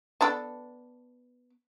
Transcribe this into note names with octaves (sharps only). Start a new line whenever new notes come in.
B3 D4 A4